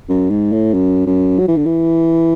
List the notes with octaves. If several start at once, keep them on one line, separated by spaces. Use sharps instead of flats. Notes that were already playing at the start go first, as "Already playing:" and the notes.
F#2
G#2
A2
F#2
F#2
F#3
E3
D3
E3